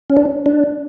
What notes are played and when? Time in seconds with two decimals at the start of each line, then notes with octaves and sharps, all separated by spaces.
0.10 C#4
0.17 D4
0.46 D4